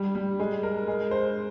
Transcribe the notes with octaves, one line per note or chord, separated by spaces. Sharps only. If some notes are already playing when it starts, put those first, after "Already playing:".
Already playing: G3
G3
G#3
A#4
G#3
C5